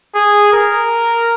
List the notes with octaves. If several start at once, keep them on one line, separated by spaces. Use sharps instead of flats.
G#4
A#4